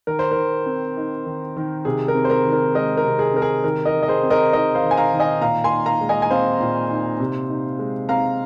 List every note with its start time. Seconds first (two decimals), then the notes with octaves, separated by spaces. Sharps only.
0.07 D#3 A#4
0.19 C5
0.31 A#4
0.36 D#3
0.66 C4
0.97 D#4
1.26 D#3
1.56 D#3
1.85 C3 G#4
2.08 A#4
2.15 C4
2.25 C5
2.30 A#4
2.45 D#3
2.53 A#4
2.75 G#3 A#4 D#5
2.97 A#4
3.04 C3
3.19 G#4
3.34 C4 A#4
3.42 G#4
3.64 D#3 A#4
3.85 A#4 D#5
3.93 D#3
4.03 D#5
4.08 G#4 C5
4.23 C4
4.30 A#4 D#5
4.53 D#4 A#4 D#5
4.75 C5 F5
4.83 D#3
4.91 G#5
4.97 F5 A#5
5.13 D#3
5.20 D#5 G#5
5.41 A#2 F5 A#5
5.64 G#5 C6
5.71 D#4
5.86 F5 A#5
6.01 G#3
6.09 D#5 G#5
6.22 G#5
6.30 C4 C5 F5
6.60 A#2
6.90 D#4
7.20 C3
7.49 D#4
7.79 G#3
8.09 C4 F5 A#5